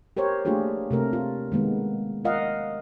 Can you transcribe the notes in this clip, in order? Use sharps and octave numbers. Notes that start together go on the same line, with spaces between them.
G4 A#4 C5 C#5
A3 A#3 D4 F4 G4 G#4
C3 A3 A#4
F4
D#3 G#3 A#3 B3
F4 A#4 D#5 F5 F#5